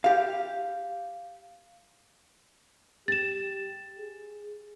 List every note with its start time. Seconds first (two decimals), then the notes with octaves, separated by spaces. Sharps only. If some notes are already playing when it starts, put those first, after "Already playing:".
0.04 G4 F5
3.08 G4 A6 E7
3.99 G#4